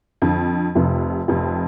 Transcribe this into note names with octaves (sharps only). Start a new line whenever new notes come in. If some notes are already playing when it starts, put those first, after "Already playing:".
F2 D3 F3
F1 F2 C3
F1 F2 C3